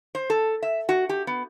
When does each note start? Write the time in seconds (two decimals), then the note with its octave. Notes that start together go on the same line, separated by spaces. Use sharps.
0.15 C5
0.30 A4
0.63 E5
0.89 F#4
1.09 G4
1.27 B3